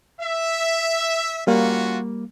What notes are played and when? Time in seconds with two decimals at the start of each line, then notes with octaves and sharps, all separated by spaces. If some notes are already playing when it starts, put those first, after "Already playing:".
0.20 E5
1.47 G3 A#3 C#4 F4 F#4